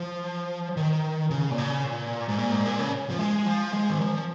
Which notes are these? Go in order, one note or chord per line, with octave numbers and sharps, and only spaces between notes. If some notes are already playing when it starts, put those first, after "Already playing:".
Already playing: F3
D#3
C#3
A#2
C#3
A#2
G#2
A#2
G#2
A#2
C#3
F3
G#3
F3
G#3
D#3
F3